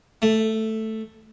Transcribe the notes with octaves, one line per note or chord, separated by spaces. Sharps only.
A3